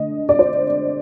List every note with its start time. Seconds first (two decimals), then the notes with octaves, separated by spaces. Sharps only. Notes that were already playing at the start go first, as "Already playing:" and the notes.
Already playing: D3 A3 D#5
0.29 D5
0.39 C5